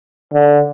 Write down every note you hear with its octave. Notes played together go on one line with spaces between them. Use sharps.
D3